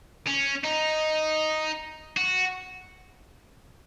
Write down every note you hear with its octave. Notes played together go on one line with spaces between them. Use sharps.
C#4
D#4
F#4